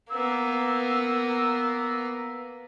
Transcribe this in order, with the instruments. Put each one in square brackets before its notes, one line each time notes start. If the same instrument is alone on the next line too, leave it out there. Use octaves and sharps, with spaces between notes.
[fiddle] A#3 B3 [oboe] E6